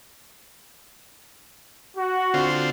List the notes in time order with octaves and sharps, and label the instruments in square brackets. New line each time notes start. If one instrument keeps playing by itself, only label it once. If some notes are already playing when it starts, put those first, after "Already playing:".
[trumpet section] F#4
[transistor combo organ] D3 C4 F4